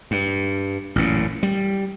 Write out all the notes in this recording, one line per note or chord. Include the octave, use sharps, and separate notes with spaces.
G2
A1 F#2 A#2
G3